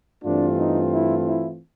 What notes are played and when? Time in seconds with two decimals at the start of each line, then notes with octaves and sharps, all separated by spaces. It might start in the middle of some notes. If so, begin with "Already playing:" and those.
0.25 G2 E3 A3 C4 D4 F4
0.58 D#4
0.92 E4
1.26 E4